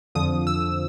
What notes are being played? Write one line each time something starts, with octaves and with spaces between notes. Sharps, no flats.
F2 D3 F3 D#6
E6